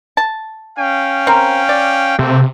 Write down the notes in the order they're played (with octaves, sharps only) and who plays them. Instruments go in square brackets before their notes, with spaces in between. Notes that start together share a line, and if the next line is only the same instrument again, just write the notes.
[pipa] A5
[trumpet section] C#4 F5 G5
[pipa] C4 A#4
D5
[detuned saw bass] C3 [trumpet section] A3 A#3 C4